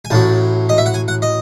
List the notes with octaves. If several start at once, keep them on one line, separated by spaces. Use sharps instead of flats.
G#5
A1 A2 F#3 A5
D#5
E5
F#5
G#5
F#5
D#5